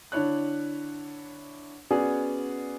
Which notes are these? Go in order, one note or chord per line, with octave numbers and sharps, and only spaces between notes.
D3 D4 E4 C#5 F#6
B3 C#4 F#4 G#4 D5